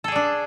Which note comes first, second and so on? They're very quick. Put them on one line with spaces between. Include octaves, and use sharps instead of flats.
A4 G#4 D5 D4